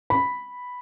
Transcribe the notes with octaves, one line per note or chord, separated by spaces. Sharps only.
B5